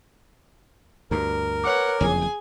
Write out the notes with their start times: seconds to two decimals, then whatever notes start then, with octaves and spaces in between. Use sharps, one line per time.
1.11 D2 G2 A#4
1.64 B4 C#5 F#5 D6
2.01 F#1 F2 E3 G#4 G#5